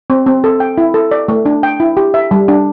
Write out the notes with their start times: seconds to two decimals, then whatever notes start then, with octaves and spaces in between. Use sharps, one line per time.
0.10 C4
0.26 C4
0.44 A4
0.60 G5
0.78 E4
0.94 A4
1.11 D5
1.28 A3
1.46 D4
1.63 G5
1.80 E4
1.97 G4
2.14 E5
2.31 G3
2.48 D4